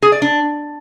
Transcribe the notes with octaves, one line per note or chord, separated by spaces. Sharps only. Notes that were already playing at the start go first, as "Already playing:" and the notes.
G#4
D5
D4